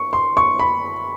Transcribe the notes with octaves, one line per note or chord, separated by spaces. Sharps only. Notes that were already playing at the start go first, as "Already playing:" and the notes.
Already playing: C#6
C6
C#6
B5